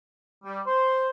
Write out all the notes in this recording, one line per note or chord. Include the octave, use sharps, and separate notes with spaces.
G3
C5